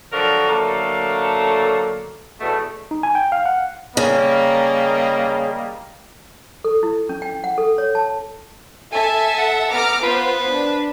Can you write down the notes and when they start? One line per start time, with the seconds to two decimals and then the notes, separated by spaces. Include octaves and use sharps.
0.13 D3 F3 F#3 F#4 A#4
0.49 D3 F#3 A3 A#3 A4
2.40 E2 B2 A3
2.91 D#4
3.03 G#5
3.15 G5
3.32 F5
3.46 F#5
3.97 C#3 G3 A#3 D#5
6.64 A4
6.83 E4
7.09 C#4
7.22 G5
7.44 F#5
7.58 A4
7.78 C#5
7.95 A5
8.92 A4 E5 G#5 A5
9.38 F#5
9.73 B3 A#5 D6 F6
10.03 B3 F4 B4 C5
10.51 D4